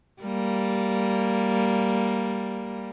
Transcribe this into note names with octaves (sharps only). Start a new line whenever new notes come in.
G3 A#3